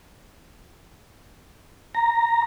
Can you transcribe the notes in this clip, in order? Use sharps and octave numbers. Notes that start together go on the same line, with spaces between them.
A#5